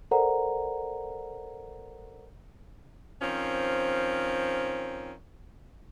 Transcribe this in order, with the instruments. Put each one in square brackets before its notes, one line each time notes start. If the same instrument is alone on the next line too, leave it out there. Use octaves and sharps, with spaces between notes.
[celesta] A4 A#4 C5 D5 F#5 A#5
[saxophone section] D#3 F3 C4 C#4